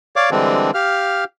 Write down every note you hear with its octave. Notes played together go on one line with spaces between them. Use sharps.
C#5 D5 F5 D6
D3 E3 G3 G#3 C4 D4
G4 F5 F6